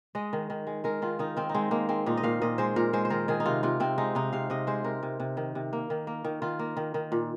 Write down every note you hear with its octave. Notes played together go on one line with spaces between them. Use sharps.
G#3 D#5
D#3
D#3
G#3
G#3 A#4
D#3 F4
D#3 D#4
D#3 C4
D#4
G#3 C4
G#3 A#3
G#3 C4
A#2 D#4
D#5
A#2 F5
A#2 D#5
G#3 C5
A#2 A#4
G#3 C5
C5
D#3 A#4
D#3 G#4
D#4
C3 F4
C3 F4
C3 C4
G#3 D#4
C3 D#4
C3 F5
C3 D#5
G#3 C5
C3 A#4
C3
C3
D#3
C3
A#3
D#3
A#3
D#3
D#3 F4
A#3
D#3
D#3
A#2